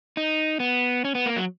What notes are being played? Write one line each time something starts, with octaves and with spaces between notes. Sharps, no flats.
D#4
B3
C#4
B3
A#3
F#3